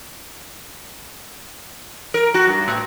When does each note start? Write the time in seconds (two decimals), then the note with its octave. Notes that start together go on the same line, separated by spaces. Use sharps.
2.14 A#4
2.34 F#4
2.47 G2
2.68 A2